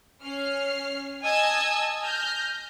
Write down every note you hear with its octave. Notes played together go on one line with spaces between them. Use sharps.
C#4 F6 C7
D#5 G#5 A5 D#6 E6 G#6
F6 G6 A#6